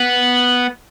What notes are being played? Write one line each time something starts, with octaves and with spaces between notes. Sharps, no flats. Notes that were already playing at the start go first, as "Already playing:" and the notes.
Already playing: B3